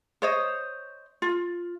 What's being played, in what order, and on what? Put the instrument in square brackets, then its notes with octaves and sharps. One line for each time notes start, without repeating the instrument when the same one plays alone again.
[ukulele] C5 C#5 D#5
F4